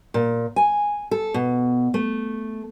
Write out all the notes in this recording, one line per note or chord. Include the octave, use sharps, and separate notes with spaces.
A#2
G#5
A4
B2
A3